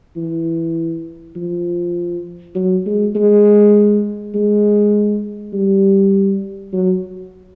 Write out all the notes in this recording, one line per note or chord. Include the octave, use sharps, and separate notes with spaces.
E3
F3
F#3
G#3
G#3
G#3
G3
F#3